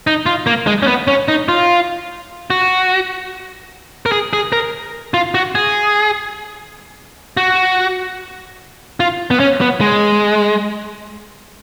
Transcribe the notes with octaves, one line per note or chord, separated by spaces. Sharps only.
D#4
F4
A#3
G#3
C#4
B3
C#4
D#4
F4
F#4
A#4
G#4
G#4
A#4
F4
F#4
G#4
F#4
F4
B3
C#4
B3
G#3